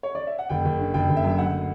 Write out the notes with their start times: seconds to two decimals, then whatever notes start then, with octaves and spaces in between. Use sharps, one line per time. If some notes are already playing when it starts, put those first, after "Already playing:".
0.03 C#5
0.15 D5
0.27 E5
0.39 F#5
0.49 F#1 G5
0.65 F#1
0.79 D3
0.94 F#1 G5
1.09 F#1
1.17 E5
1.24 F#2
1.38 D2 F#5